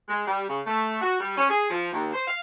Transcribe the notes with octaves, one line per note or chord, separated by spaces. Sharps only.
G#3
G3
C#3
A3
F#4
G3
C#4
G#4
F3
D#2
C5
F5